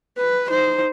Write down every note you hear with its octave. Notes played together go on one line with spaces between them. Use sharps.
B4
D#4 C5